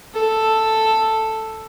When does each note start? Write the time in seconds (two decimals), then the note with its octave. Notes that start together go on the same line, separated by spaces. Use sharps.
0.14 A4